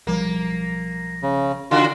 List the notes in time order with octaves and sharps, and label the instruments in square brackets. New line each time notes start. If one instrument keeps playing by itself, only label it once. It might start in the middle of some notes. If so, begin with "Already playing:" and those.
[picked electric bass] B1 F3 G3 [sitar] A#3
[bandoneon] C#3
[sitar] C#3 F#4 [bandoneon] F4